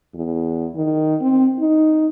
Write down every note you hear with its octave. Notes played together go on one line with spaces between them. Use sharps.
E2
D#3
C4
D#4